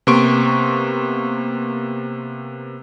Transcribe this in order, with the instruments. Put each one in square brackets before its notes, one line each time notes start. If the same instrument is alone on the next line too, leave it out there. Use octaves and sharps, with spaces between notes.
[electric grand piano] C3 A#3 B3 C6 C#6 D7